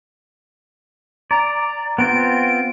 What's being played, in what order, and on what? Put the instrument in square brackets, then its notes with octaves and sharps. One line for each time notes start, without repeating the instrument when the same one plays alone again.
[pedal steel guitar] D5 [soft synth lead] A#5
[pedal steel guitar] B3 C4 F4 [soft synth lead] D7